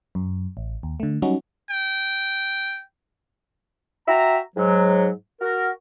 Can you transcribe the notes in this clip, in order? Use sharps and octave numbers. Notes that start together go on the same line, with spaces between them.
F#2
A1
D#2
D3 A3
F#3 G3 C#4 D#4 F#4
G5
F#4 E5 G5 A#5
G#2 F#3
F#4 A#4